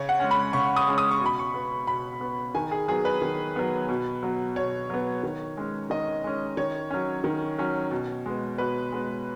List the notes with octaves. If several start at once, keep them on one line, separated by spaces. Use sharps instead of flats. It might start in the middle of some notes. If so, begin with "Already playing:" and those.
Already playing: C#3 C#5
F#5
G#3 C#4
B5
C#3 C#6
D#6
G#3 C#4
D#6
C#6
B2
B5
C#6
B3
B2 B5
B3
D#3 G#5
G#4
F#3 B3 G#4
B4
D#3
F#3 B3
B2
F#3 B3
B2 C#5
F#3 B3
D#3
G#3 C#4
D#3 D#5
G#3 C#4
D#3 C#5
F#3 C#4
D#3
F#3 C#4
B2
G#3 B3
B2 B4
G#3 B3